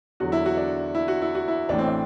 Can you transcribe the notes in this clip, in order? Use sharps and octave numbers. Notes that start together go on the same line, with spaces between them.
E2 D3 F#3 F#4
E4
F#4
D4
E4
F#4
E4
F#4
E4
A1 A2 E3 D4
C4
D4